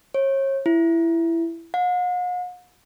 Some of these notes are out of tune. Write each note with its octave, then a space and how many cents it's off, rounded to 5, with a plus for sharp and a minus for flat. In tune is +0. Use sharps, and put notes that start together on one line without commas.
C#5 -35
E4 +15
F#5 -45